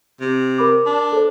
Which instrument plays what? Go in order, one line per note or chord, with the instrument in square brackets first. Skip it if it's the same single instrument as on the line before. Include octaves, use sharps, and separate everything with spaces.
[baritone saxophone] C3
[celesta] A#4 B5 D6
[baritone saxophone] D4
[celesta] A4 C5